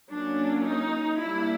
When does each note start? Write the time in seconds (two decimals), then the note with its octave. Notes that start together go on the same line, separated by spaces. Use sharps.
0.11 F#3 A#3 C#4 D4
0.65 D#4
1.20 G3 A#3 D4 E4